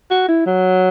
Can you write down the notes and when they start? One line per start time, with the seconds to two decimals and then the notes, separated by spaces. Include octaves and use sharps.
0.11 F#4
0.28 E4
0.46 F#3